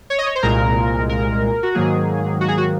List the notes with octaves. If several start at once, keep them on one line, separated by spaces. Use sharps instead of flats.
C#5
D#5
C#5
C5
C2 A#2 G#3 A#4
A#4
F#4
G#2 D#3 F#3 A#3 G#4
F#4
G#4
F#4